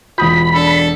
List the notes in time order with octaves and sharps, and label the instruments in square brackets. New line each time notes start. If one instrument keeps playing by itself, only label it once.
[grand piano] E1 D#6 G6 [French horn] F4 [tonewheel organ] B5
[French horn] D4 [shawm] A4